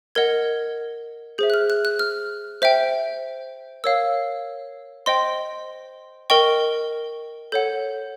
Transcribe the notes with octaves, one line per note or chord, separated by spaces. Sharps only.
A#4 D#5 F#5 G#6
G#4 C5 E5 G6
F#6
F6
F#6
F#6
F6
C5 E5 G5
A#4 C#5 F5 E6
C5 D#5 G5 C6
A#4 D#5 G5 C#6
A4 C#5 F#5 G6